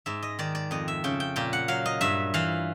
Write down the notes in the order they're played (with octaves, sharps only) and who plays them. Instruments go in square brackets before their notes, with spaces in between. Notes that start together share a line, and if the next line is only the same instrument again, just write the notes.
[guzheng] G#2 E5
D#5
D#3 D5
D5
F2 D#5
E5
C#3 G5
G5
A#2 G5
F#5
F#3 F5
D#5
G2 E5
E3 F5